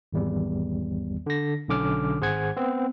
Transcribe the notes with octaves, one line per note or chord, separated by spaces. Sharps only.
G#1 E2 G3
D3 A#6
B1 D3 C#4 D6 F6
G#1 G#4 C5 F#5 G#6
B3 C4